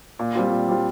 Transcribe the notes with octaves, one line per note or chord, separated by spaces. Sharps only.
A#2
G3 C4 F4
A#2
G3 C4 F4